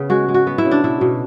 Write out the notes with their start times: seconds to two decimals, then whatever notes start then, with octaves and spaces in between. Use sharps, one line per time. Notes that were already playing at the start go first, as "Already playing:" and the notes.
Already playing: C#3 B3
0.10 G#3 F#4
0.29 G#3
0.34 F#4
0.47 B3
0.58 E4
0.65 C#3
0.71 D4
0.84 B2 E4
1.01 B2